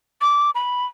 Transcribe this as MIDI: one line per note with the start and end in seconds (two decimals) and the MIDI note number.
0.21 0.51 86
0.55 0.86 83